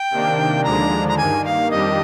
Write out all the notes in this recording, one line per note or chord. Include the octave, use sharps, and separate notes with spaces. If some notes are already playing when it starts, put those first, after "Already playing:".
Already playing: G5
C3 D#3 A#3 D4
D#2 D3 F3 G#3 D4 A#5
A#5
G2 D#3 A#3 G#5
F5
F2 D#3 G3 D4 G4 D#5